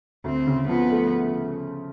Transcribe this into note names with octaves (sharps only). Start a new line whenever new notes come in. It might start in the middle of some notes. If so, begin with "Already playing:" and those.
D2 C4
C#3
F3 B3
A3